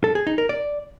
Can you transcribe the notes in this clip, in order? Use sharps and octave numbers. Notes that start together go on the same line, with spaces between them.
A4
G#4
D#4
A#4
D5